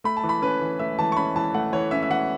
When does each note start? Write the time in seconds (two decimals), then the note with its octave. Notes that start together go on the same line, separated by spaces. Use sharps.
0.04 A3 B5
0.17 A5
0.24 E3
0.29 B5
0.42 C#4 B4
0.61 E3
0.79 A3 E5
0.99 E3 A5
1.12 C#6
1.17 C#4 B5
1.36 E3 A5
1.54 A3 F#5
1.73 E3 C#5
1.91 C#4 E5
2.03 E5
2.10 E3 F#5